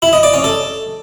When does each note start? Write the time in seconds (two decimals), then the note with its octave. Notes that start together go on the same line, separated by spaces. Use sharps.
0.02 E4
0.13 D#5
0.23 D5
0.34 C#4
0.44 A4